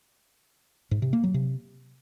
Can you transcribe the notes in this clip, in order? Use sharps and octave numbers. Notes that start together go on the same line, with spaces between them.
G#2
C3
A#3
F#3
C3